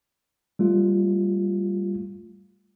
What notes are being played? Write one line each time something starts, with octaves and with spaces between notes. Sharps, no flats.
G3 A3 F4